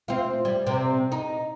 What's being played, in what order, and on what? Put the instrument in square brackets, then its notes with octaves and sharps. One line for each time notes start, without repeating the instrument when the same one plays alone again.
[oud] C4 F4
G3
C3 C4
D#4